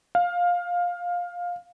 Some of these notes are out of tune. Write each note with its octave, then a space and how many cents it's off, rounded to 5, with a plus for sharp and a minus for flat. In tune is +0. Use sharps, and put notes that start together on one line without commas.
F5 +15